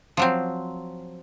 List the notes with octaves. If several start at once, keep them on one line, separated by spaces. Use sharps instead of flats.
F3 F#3 C4